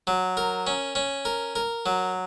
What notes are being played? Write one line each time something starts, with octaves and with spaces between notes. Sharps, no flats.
F#3
A#4
C#4
C#4
A#4
A#4
F#3